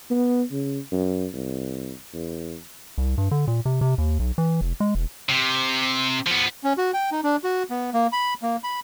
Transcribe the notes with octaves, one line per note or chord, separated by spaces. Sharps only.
B3
C#3
F#2
C2
E2
C2
G2
D3
A#2
C3
C3
D#2
B1
E3
F1
G#3
E1
C3
F3 B3
C#4
F#4
G5
D#4
D4
F#4
B3
A#3
B5
A#3
B5